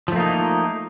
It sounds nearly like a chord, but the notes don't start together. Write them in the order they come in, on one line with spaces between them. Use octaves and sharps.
F3 A3 A#3 D#4